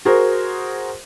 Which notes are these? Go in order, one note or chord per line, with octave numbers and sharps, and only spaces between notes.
F#4 G#4 A#4 C5